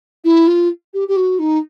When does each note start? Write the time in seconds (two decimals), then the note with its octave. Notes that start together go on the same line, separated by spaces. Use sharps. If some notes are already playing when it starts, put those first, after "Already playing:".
0.24 E4
0.47 F4
0.94 G4
1.08 G4
1.16 F#4
1.39 D#4